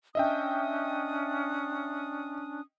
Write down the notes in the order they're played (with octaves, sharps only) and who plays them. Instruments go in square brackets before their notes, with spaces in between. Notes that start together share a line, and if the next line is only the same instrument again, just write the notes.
[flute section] C#4 D4 D#6 [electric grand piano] D#5 E5 G5